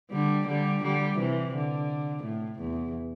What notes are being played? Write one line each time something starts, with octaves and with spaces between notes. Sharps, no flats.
D3 G3
D3 G3
D3 G3
C3 E3
D3
A2
E2